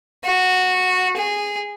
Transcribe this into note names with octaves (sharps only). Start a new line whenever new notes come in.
F#4
G#4